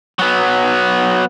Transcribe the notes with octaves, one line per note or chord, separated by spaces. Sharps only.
F#3 B3